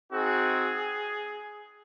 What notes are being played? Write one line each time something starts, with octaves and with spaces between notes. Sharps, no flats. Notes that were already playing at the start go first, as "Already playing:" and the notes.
C4 D#4 F#4 G#4